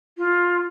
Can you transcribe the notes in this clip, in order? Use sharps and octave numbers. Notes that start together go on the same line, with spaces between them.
F4